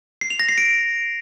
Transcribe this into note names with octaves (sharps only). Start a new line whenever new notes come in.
C7
F7
A#6
C7
D7